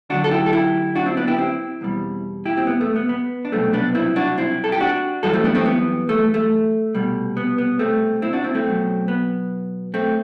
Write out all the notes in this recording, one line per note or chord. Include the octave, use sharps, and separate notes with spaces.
D2 D3 F#3 D4 F#4
A4
E4 G4
A4
E4 G4
D4 F#4
C4 E4
B3 D4
E4 G4
C4 E4
E2 B2 G3
E4 G4
C4
B3
A3
B3
B3
D4
C2 B2 F#3 A3 C4
B3 D4
C4 E4
D4 F#4
C4 E4
A4
G4
D4 F#4
F#2 E3 G3 F#4 A4
A3 C4
B3 D4
A3 C4
B3
A3
A3
C2 B2 G3
B3
B3
A3 C4
C4 E4
D4 F#4
C4 E4
A3 C4
B1 B2 F#3
B3
A3 C4